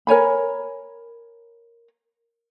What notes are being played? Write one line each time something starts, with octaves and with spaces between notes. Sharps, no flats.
A#4 C#5 G#5 B5